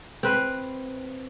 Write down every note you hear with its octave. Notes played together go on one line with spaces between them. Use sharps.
C4 B4